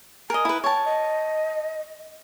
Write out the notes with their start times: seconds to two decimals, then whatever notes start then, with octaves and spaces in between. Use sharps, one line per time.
0.30 A#4 D#5 G#5
0.45 E4 B4
0.64 C#5 G5 A5
0.85 D#5